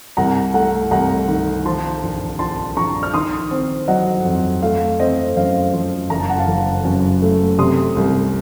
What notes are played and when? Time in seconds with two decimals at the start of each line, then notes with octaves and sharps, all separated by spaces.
0.17 C2 F#5 A#5
0.54 A3 F#5 A#5
0.91 C2 F#5 A#5
1.28 D#3
1.66 F3 A5 C6
2.03 A#1
2.39 A#1 A5 C6
2.76 A#1 A#5 C#6
3.03 F6
3.14 D#3 C6 D#6
3.51 C4
3.88 F#3 D#5 F#5
4.25 F2
4.62 A3 F5
4.99 C4 D#5
5.36 F#2 F5
5.73 F3
6.10 F#1 A#5
6.20 A5
6.30 F#5
6.39 F5 A5
6.48 F#1
6.84 F#2
7.22 A3
7.59 C3 C6 D#6
7.96 C2